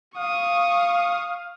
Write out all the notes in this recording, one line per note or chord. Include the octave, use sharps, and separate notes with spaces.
F5 C#6 D#6